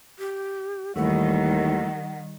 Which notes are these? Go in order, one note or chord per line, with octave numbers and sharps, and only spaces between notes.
G4
D#2 D#3 E3 G3 A3 F#5